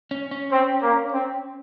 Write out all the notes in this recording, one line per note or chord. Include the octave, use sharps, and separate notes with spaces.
C#4
C#4
C4
A#3
C4